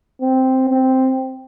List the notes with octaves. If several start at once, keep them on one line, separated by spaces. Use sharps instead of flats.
C4
C4